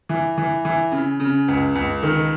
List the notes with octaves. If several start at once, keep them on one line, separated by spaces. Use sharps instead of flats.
E3
E3
E3
C#3
C#3
C#2
C#2
D#3